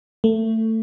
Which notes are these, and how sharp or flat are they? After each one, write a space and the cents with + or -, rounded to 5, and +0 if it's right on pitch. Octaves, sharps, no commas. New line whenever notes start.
A3 +20